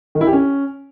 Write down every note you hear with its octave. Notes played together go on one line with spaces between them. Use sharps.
D#3
E4
G4
C#4